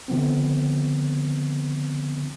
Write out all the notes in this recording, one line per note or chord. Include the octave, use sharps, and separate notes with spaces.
D3 F3 B3 C4